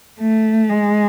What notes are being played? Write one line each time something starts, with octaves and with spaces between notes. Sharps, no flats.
A3
G#3